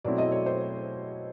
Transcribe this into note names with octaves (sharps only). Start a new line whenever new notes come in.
B2 F#3 A3 C4 E4 D5
D#5
C#5
C5